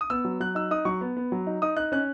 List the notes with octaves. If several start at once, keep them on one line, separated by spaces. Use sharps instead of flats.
D#6
B3 E6
F#3
F#3 F#6
D#4 E6
D#4 D#6
F#3 C#6
B3
B3
F#3
D#4
D#4 D#6
D#4 F#6
C#4 F#6